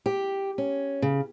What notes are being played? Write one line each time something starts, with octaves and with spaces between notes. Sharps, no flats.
G4
C#4
C#3